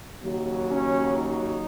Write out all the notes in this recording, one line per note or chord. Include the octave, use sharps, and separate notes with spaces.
D#2 C#3 F#3
C#4
D#4